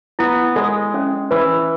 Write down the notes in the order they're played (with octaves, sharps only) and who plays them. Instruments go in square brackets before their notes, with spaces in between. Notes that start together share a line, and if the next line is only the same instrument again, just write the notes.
[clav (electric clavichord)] B3 [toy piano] E4
[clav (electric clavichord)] G#3 [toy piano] A4
[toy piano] C#4
[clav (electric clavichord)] E3 [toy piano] B4